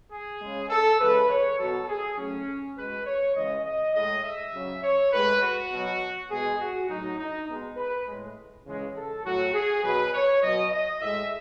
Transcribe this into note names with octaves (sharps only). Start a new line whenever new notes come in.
G#4
C#3 G#3
A4
C#3 E3 G#3 B4
C#5
B2 F#3 A4
G#4
A2 F#3 C#4
B2 G#3 B4
C#5
C#3 E3 G#3 D#5
D#5
A2 G#3 D#5
E5
C#3 F#3
C#5
A2 G#3 B4
F#4
B2 F#3
B2 G#3 G#4
F#4
A2 F#3 D#4
D#4
B2 G#3
B4
A2 G#3
C#3 E3 G#3
A4
A2 F#3 F#4
G#4
B2 F#3 B4
C#5
B2 F#3 D#5
D#5
A2 G#3 E5